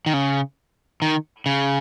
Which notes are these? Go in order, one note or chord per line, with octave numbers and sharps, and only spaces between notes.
D#3
C#3
D#3
C#3